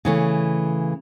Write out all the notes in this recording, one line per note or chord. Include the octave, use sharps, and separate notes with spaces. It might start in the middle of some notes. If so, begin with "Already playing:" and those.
C#3 E3 A3